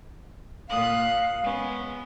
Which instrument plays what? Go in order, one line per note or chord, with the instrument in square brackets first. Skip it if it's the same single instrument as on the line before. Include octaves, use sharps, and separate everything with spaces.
[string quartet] A#2 D#6 F#6 [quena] F5
[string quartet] G#3 B3 C#4